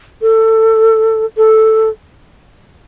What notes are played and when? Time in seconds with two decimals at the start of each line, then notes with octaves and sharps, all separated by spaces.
0.22 A4
1.37 A4